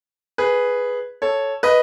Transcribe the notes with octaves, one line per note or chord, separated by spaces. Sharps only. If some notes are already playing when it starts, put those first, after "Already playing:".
G#4 B4
A4 C#5
B4 D#5